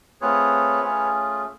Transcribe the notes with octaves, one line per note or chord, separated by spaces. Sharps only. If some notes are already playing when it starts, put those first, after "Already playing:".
A3 C4 F4 G#4 B4 C#5
A3 C#4 F4 G#4